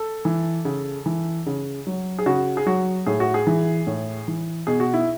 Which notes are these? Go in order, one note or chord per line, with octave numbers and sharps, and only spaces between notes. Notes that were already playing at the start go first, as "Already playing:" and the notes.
Already playing: A4
E3
C#3
E3
C#3
F#3
G#4
C#3 F#4
G#4
F#3 F#4
A2 G#4
F#4
G#4
E3
A2
E3
B2 G#4
F#4
E4